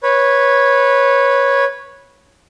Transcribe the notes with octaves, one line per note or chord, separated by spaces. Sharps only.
B4 C#5